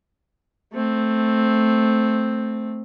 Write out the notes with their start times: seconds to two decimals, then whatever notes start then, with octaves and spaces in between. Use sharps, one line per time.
0.73 A3 C4